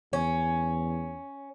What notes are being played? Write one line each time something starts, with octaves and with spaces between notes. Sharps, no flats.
E2 C#4